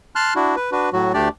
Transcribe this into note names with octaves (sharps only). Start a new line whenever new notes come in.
A5 C6 F6 F#6
D4 E4 F#4
B4
D4 F#4 B4
A2 F#3 F#4
D2 A3 D4 G4 D5